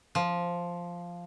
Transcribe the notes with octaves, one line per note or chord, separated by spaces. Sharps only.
F3